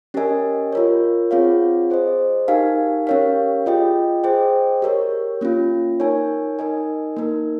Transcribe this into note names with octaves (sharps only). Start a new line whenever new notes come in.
C#4 G4 A#4 D#5 G#5
F4 A#4 C#5
C4 F4 G#4 C#5 F5
G#4 C5 D#5
D#4 G4 A#4 F5 G#5
C#4 G4 A#4 C#5 F5
F4 G#4 D#5 G5
G#4 C5 D#5 G5
G4 A#4 C#5
A#3 C#4 F4
D#4 A#4 C#5 G#5
D#4 A#4 D#5 G#5
A#3 D#4 A#4